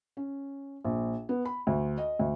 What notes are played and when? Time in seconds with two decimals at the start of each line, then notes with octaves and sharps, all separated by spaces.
0.17 C#4
0.84 A#1
1.29 B3
1.45 B5
1.67 D2
1.98 D#5
2.19 D2